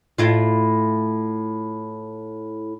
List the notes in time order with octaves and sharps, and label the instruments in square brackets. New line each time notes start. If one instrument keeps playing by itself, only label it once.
[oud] A2 E4 F4